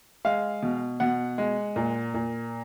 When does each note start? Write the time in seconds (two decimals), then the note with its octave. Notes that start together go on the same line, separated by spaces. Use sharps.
0.25 G#3 F5
0.62 B2
1.00 B2 F#5
1.38 G#3
1.76 A#2
2.14 A#2